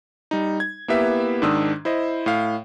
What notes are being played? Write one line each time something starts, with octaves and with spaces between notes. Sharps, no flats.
G3 D#4
G#6
A#3 B3 E4 G4 B4 E5
G#2 D#3 D4 D#6 E6
E4 C5 D#5
A2 F5